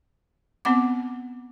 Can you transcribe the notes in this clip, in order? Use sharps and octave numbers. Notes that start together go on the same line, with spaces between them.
B3 C4 F#5 D6